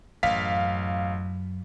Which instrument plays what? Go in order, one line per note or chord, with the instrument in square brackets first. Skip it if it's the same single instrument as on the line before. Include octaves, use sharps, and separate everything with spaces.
[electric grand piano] A1 F5 B6 [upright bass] F#2